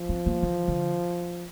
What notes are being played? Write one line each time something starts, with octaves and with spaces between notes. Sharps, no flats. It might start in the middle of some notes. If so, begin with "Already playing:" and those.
Already playing: F3
C4
A#3
E3
D3